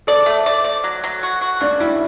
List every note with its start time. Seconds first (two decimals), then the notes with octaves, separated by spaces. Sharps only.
0.07 A4 D5
0.26 A3
0.46 D5
0.64 D5
0.84 F#3
1.04 F#3
1.23 F#4
1.41 F#4
1.61 C#3 D4
1.80 G3 E4